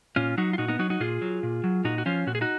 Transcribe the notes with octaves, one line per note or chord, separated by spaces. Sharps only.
A#2 C#4 F4
F#3 D#4 F#4
F4
A#2 D#4 F#4
B3 D#4
F#3 D#4 F#4
D#4 F#4
A#2 F4 G#4
F#3
A#2
F#3
A#2 D#4 F#4
F#4
F3 C#4 F4
A#2 F#4
G#4
D#4 F#4